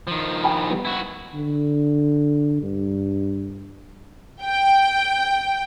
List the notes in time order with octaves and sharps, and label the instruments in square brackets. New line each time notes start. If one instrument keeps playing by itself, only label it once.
[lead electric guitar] D#3 F3
[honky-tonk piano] G5 G#5 B5
G3 B3
[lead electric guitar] E4 F#4
[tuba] D3
G2
[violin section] G5